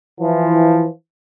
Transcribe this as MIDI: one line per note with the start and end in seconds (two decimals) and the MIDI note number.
0.21 0.87 52
0.21 0.87 53